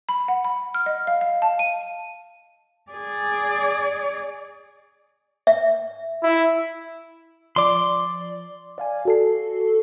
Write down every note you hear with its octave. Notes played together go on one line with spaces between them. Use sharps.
B5
F#5
B5
F6
D#5
F5
F5
A5
D#7
G#4 D5
E5
E4
F3 D5 C6 D6
D5 F5 G#5
F#4 A4 C7